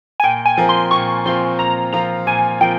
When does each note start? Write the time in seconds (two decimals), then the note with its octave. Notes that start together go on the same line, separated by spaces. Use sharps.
0.20 G#5
0.23 A#2 G5
0.46 G#5
0.57 F3 C4 F4 A#4
0.69 C6
0.91 A#2 C#6
1.25 F3 C4 F4 A#4 C6
1.59 A#2 A#5
1.93 F3 C4 F4 A#4 A#5
2.27 A#2 G#5
2.61 F3 C4 F4 A#4 G5